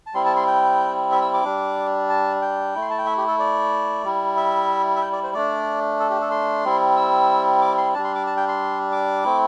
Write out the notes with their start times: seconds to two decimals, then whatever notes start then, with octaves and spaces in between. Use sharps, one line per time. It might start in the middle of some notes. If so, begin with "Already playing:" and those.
0.06 A5
0.14 G3 C4 E4 C6
0.25 A5
0.36 C6
0.47 G5
1.12 E5
1.22 E6
1.34 D6
1.45 G3 D4
2.10 A5
2.42 G5
2.75 A3 E4
2.82 C6
2.90 A5
2.98 G5
3.06 E5
3.17 G4
3.28 A4
3.39 D5
4.04 G3 E4
4.37 E5
4.96 E5
5.01 G5
5.12 D5
5.23 C5
5.34 A3 D4 D5
6.00 A4
6.10 G4
6.21 A4
6.31 C6
6.65 G3 C4 E4
6.97 E6
7.62 D6
7.77 C6
7.94 G3 D4 A5
8.04 C6
8.15 D6
8.27 A5
8.37 G5
8.48 C6
8.92 D6
9.24 A3 C4 E4